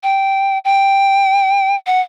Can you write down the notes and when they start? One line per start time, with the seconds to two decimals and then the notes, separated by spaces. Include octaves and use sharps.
0.03 G5
0.65 G5
1.87 F#5